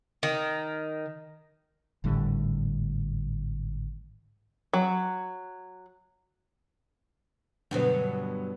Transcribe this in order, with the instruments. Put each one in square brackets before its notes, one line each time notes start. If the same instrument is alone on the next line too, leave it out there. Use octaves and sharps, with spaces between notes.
[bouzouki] D#3
[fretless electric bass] G#1 A2 D3 G3
[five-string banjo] F#3
[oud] G2 B2 F#3 [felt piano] D3 B3